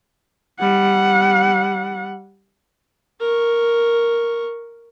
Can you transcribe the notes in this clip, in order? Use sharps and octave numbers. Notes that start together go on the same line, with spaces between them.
G3 F#5
A#4 C#6